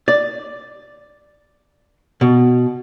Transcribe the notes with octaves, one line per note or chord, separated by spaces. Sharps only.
D5
B2